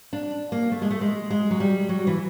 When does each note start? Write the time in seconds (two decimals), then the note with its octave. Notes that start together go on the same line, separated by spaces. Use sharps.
0.13 D4
0.52 A#3
0.72 A3
0.82 G#3
0.91 A3
1.01 G#3
1.30 G#3
1.51 F#3
1.60 G3
1.89 F#3
2.07 E3